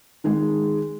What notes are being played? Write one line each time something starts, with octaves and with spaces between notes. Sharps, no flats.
D#3 G#3 G#4